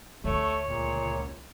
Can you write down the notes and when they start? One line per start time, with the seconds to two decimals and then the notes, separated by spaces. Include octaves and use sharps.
0.24 D2 A3 C#5
0.68 C#2 A#2